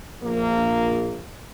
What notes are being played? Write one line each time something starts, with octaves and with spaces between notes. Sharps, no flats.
A#1 A#3